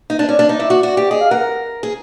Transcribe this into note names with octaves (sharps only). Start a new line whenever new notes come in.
D#4
D4
C#4 D5
D4
D#4
E4
F#4
F#4
G4
G#4 D#5
F5
A#4 F#5
G#4